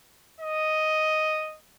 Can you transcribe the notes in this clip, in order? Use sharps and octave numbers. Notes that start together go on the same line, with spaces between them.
D#5